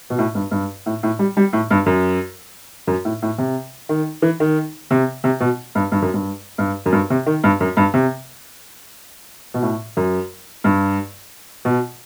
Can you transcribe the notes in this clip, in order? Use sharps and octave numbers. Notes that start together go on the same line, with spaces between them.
B2
A2
G2
G2
A2
A2
G3
G3
A2
G2
F#2
F#2
A2
A2
C3
D#3
E3
D#3
C3
C3
B2
G2
G2
F#2
G2
G2
F#2
G2
C3
D#3
G2
F#2
G2
C3
B2
A2
F#2
G2
B2